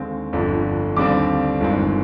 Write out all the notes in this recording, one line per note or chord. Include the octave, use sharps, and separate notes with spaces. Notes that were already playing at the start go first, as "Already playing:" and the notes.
Already playing: D#2 D3 G#3 C4
G1 F2 D3
D#2 D3 G3 C4 D6
G1 G2 D#3 G#3 C4